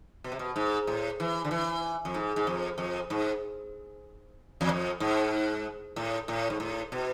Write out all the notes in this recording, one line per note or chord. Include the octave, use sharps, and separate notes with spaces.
B2
C3
B2
G#2
A2
E3
D3
E3
F2
G#2
G#2
F2
F2
G#2
E2
F2
G#2
A2
A2
G#2
A2
B2